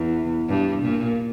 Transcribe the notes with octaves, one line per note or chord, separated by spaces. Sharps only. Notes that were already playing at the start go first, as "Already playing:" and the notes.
Already playing: E2
G2
A#2